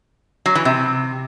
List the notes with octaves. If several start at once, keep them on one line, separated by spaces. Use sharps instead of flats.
F#3
E3
C3